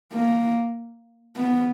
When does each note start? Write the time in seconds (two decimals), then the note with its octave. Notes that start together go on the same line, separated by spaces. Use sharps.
0.13 A#3
1.36 B3